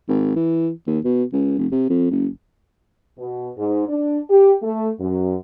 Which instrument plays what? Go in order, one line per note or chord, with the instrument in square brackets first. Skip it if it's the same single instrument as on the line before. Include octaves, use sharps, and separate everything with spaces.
[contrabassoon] G#1
E3
D#2
B2
C#2
F1
C3
F2
F#1
[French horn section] B2
G#2
D4
G4
A3
F#2